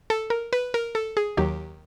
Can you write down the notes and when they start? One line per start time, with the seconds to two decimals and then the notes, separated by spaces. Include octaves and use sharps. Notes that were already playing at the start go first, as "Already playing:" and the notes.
0.10 A4
0.30 A#4
0.53 B4
0.74 A#4
0.95 A4
1.17 G#4
1.37 D#2 D#3 F#3 G4